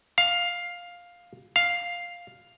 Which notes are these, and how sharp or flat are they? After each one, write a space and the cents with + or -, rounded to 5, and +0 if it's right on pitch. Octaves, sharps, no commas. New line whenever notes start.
F5 +10
F5 +5